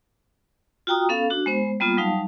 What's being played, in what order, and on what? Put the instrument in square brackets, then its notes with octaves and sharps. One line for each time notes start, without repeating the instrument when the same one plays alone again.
[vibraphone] F4 F#4 G5 A#5 D#6
B3 C#4 A4 F5
D4 F#4
G#3 B3 C5
G3 A#3 B3 F4
F#3 G3 D#4 F5 A5